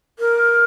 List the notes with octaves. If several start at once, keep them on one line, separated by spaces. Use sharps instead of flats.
A#4